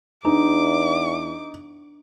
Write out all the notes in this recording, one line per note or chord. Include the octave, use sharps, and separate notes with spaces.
E2 D4 D#4 D6